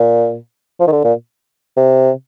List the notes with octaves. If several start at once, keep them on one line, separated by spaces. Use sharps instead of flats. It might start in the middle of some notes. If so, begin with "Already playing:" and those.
Already playing: A#2
F3
D#3
D3
A#2
C3